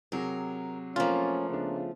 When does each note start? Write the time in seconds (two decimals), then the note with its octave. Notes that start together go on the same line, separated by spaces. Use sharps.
0.12 C3 F#3 G#4 A#4
0.96 F3 A3 A#3 C#4 F4
1.50 C#3 B3 D4